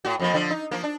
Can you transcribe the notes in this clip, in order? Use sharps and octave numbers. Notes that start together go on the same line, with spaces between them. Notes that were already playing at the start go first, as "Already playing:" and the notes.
A2 F#4
F2 F3 A#3
D3 F3
D#4
F3 A#3
D4